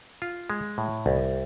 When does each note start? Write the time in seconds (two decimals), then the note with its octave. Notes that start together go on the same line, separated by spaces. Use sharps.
0.22 F4
0.50 G#3
0.78 A2
1.06 C2